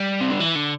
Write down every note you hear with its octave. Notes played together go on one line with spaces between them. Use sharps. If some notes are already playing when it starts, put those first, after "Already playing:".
Already playing: G3
C3
D3
E3
D3